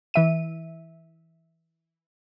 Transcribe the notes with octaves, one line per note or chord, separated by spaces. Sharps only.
E3 E5 D#7